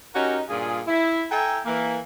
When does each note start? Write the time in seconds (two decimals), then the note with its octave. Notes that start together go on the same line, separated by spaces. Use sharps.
0.15 C#4 D#4 F#4 G4 A#4
0.49 G2 A#2 F4 G#4
0.87 E4
1.31 A4 E5 G5 G#5 A#5
1.65 E3 A#3